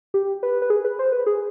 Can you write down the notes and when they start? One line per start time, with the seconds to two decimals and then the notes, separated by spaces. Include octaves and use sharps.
0.14 G4
0.43 B4
0.62 B4
0.70 G#4
0.85 B4
0.99 C5
1.12 B4
1.26 G#4